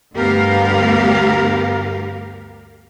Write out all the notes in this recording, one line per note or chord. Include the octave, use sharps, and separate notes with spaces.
D2 G2 B3 G4 A#4 F5